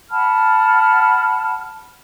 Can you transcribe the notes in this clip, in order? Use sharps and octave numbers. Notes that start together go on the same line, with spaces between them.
F#5 A5 B5 F6